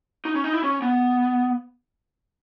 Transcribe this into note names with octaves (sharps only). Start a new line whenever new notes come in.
D#4
C#4
D#4
E4
C#4
B3